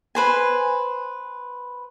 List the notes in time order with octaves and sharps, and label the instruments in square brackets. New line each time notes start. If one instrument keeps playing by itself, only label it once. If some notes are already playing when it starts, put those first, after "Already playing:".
[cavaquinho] B4 C5 G#5